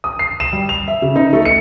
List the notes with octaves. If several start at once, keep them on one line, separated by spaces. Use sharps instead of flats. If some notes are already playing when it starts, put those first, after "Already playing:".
D#6
C7
E7
G3
F7
E5
C#3
D#4
A3
C#7